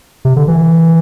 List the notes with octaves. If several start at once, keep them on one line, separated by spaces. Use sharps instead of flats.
C3
D3
E3